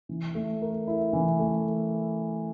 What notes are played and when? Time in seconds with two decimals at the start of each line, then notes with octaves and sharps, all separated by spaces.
0.09 E3
0.35 A3
0.62 A#4
0.87 E4
1.13 E3
1.39 A3